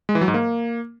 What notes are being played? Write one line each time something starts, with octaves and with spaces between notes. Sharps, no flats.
G#3
E3
F#3
G#2
A#3